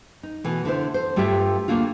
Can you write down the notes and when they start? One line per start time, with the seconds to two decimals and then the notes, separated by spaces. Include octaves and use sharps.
0.23 D#4
0.44 B2 E3 A3
0.65 D3 E4 C5
0.94 C5
1.16 G2 A3 F4 G4 C#5 E5
1.68 D2 A3 A#3 D4 F4